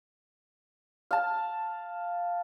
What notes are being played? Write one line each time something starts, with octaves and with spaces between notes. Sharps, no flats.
F5 A5